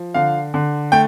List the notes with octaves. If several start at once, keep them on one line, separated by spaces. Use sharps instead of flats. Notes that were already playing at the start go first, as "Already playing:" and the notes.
Already playing: F3
D3 F5
D3
A3 G5